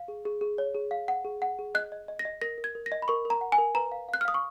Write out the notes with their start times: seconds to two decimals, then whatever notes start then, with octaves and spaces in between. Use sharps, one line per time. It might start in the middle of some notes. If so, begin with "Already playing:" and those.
Already playing: F5
0.08 G#4
0.25 G#4
0.41 G#4
0.58 C#5
0.75 G#4
0.91 F5
1.08 F#5
1.25 G#4
1.42 F#5
1.59 G#4
1.75 D#5 F#6
1.92 D#5
2.08 D#5
2.19 A#6
2.25 D#5
2.41 A#4 A#6
2.58 A#4
2.64 G#6
2.75 A#4
2.86 A#6
2.92 D#5
3.02 B5
3.08 A#4 C#6
3.25 A#4
3.30 A#5
3.41 F#5
3.52 G#5
3.58 A#4
3.75 B4 A#5
3.92 F5
4.09 F5 F#6
4.21 F6
4.25 F5 D#6
4.34 C#6